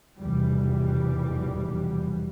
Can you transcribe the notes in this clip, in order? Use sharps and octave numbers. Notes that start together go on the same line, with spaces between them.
F1 B1 E2 G#2 E3 G3